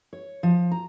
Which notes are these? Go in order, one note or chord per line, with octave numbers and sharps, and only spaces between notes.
C#5
F3
A#5